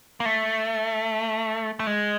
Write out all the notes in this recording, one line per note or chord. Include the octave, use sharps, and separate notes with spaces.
A#3
A3
A3
G#3